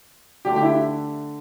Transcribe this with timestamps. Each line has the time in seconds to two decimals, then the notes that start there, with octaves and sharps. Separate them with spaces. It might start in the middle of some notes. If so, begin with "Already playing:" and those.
0.45 D3 A3 D4 G4
0.56 G4
0.63 E4